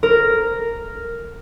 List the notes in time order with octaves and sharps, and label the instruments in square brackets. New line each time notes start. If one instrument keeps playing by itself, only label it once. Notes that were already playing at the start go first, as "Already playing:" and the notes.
[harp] A#4